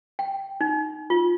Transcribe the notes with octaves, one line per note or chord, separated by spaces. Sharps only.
G5
D#4
F4